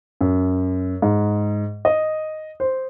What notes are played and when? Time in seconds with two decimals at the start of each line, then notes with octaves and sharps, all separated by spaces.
0.21 F#2
1.02 G#2
1.85 D#5
2.60 C5